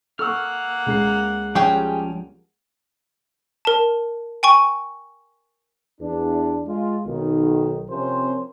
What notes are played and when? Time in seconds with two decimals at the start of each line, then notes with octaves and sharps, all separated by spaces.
0.19 A#3 A4 F#5 C#6 E6 F6
0.86 C#2 G#3 C7
1.55 F3 G3 C#4 G4 G#4 G5
3.65 A#4 A5
4.43 G5 G#5 C#6
6.01 E2 D4
6.67 G#3 F4
7.06 B1 D#3
7.90 C3 F3 C4 C#4 A#4 C5